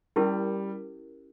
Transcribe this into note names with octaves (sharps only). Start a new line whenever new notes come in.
G3 C#4 E4 G4 A#4